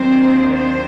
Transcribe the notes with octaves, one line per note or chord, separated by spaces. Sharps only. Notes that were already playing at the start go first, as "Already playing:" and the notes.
Already playing: D#2 D#3 F#3 A#3 C4 D4 C5
C4 C5